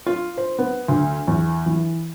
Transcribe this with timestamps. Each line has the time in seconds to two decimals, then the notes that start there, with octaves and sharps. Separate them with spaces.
0.06 F4
0.37 C5
0.59 B3
0.88 D2
1.27 E2
1.66 E3